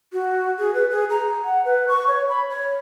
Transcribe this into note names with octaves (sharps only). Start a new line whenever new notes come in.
F#4
G#4
B4
G#4
A#5
F#5
B4
C#6
C#5
B5
C#5